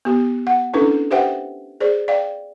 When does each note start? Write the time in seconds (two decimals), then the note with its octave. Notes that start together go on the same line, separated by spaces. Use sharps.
0.05 B3 G4
0.47 F#5
0.73 C#4 D4 E4 A4 B4
1.11 G4 B4 C5 E5 F#5 G5
1.80 G#4 C5 D5
2.08 D5 F5 G5